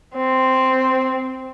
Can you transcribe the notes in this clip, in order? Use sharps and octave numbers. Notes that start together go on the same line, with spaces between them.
C4